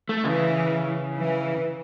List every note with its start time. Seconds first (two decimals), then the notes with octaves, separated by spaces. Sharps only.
0.09 A3
0.24 C#3 E3
1.16 E3